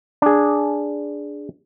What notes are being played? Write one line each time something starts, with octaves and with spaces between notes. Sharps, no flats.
D4 G#4